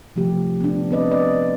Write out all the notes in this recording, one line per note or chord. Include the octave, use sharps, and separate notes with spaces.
C3 F3 A3 G4
B3 D4
B3 C4 B4 D5 D#5
B4 D5 D#5